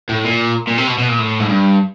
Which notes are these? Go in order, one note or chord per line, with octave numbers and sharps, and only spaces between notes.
A2
A#2
A#2
C3
B2
B2
A#2
A2
G#2
G2